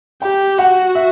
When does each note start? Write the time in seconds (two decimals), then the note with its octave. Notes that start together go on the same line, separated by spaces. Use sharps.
0.22 G4 G5
0.58 F#4 F#5
0.95 E5